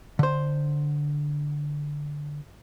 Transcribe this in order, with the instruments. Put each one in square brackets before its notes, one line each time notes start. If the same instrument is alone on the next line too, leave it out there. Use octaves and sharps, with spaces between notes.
[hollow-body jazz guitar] D3 C5